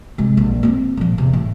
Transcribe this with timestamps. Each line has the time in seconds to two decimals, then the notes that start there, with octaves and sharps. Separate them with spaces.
0.18 C3 G#3
0.37 A#1
0.63 A#3 C4
0.97 A#2 F3
1.18 E2 C3
1.33 A2